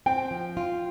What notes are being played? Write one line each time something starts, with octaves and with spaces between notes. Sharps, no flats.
C4 G5
F3
F4